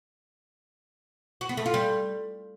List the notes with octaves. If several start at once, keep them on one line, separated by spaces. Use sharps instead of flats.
F#4
B3
A3
F4
G3